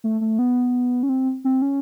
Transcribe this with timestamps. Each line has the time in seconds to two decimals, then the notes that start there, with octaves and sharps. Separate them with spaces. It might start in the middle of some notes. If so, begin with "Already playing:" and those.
0.04 A3
0.21 A3
0.39 B3
1.03 C#4
1.09 C4
1.44 C4
1.62 C#4